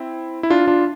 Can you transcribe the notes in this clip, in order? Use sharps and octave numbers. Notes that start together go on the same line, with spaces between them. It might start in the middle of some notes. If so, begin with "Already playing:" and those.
Already playing: C4 E4
E4
D4 F4
D4 F4